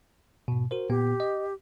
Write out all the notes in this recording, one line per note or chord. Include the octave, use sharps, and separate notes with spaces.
G#2 B2
F#4 A#4 C5
A#2 B3 G4
D#5